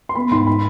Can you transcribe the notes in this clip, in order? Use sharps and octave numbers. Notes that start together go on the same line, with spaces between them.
C6
B3 B5
G#2 C6
B5